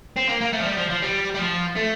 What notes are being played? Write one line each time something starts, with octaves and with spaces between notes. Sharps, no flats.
C4
A#3
A#3
A3
F3
G3
F3
F3
G3
G3
F3
A3